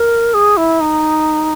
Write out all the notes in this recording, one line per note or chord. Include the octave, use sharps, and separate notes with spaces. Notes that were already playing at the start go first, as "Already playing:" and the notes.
Already playing: A#4
G#4
E4
D#4